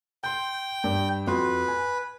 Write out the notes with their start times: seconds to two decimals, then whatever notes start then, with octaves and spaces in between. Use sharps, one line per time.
0.24 G5 C6 G6
0.84 G2
1.27 F2 F#4 B4 C6
1.68 G#5